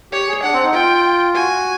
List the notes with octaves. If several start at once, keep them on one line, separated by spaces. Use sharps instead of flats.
G4 C#5
G#4
D4 F#5
C4
D#4
F4 G5
F#4 G#5